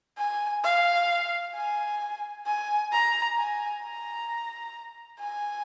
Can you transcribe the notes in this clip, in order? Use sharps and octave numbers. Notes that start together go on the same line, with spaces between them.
G#5
F5
G#5
G#5
A#5
G#5
A#5
G#5